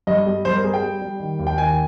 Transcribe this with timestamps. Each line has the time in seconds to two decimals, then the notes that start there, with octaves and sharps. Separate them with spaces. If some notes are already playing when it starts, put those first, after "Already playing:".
0.07 G2 D#5
0.26 G3
0.45 G2 C5
0.54 A#4
0.64 G3 G#4
0.74 G5
0.82 G3
1.01 G3
1.20 D#3
1.39 D#2
1.47 G5
1.58 D#3 G#5